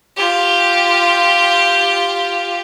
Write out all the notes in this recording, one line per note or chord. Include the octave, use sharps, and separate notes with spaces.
F4 G4